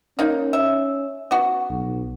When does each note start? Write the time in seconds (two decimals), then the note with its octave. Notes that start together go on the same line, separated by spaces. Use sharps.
0.19 A#3 C#4 D#4
0.53 E5
1.31 B3 F#4
1.70 B1